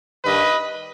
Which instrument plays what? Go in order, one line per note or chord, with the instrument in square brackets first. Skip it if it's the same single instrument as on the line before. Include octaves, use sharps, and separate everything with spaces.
[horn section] G2 D#3 G3 B4 D#5